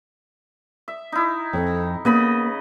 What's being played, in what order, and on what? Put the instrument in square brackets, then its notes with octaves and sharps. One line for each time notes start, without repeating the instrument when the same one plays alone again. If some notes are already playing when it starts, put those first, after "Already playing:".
[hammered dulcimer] E5
D#4 E4
[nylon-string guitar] F2
[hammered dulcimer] C#3 D#5 B5 [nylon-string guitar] A#3 B3